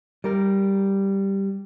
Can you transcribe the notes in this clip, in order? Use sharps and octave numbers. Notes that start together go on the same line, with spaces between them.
G3 A#4